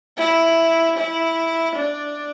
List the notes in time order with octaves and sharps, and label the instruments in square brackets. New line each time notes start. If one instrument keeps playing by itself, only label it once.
[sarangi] E4
E4
D4